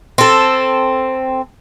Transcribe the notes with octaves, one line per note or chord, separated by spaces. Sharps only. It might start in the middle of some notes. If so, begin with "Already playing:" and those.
C4 A4